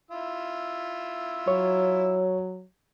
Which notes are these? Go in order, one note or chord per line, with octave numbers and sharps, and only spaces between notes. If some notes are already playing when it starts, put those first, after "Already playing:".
E4 F4 E6
F#3 C#5